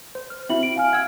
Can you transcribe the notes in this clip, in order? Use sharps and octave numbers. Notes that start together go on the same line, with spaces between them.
C5
F6
C4 E4 F#4 E5 F#7
D7
F5 G#5 F6
F#5 E6 G#6